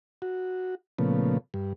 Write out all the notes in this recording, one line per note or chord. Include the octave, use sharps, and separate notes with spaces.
F#4
A#2 C#3 F3 A3 B3
G2